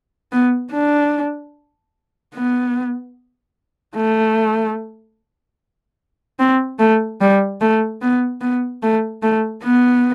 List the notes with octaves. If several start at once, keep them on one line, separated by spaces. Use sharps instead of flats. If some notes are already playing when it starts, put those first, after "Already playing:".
B3
D4
B3
A3
C4
A3
G3
A3
B3
B3
A3
A3
B3